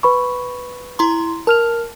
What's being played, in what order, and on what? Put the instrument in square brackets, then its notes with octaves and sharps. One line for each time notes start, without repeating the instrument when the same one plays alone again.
[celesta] B4 B5 C#6
[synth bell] E4 A#5 C6
[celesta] A#4 F6 F7 [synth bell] A5